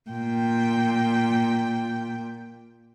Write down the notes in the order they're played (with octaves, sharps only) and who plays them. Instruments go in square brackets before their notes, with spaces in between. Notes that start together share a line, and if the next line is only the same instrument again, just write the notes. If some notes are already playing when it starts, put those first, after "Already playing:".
[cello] A#2 G5